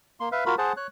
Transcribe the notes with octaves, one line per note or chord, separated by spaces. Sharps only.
A#3 C6
B4 E5 F5
F4 F#4 A#4 B5
G#4 C5 F#5 A5
C#5 F#6